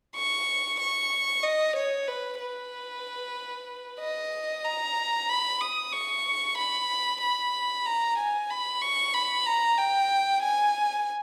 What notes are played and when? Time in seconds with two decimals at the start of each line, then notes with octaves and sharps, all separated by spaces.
0.16 C#6
0.80 C#6
1.43 D#5
1.76 C#5
2.08 B4
2.40 B4
4.00 D#5
4.65 A#5
5.29 B5
5.61 D#6
5.93 C#6
6.58 B5
7.22 B5
7.86 A#5
8.18 G#5
8.50 B5
8.82 C#6
9.14 B5
9.46 A#5
9.78 G5
10.42 G#5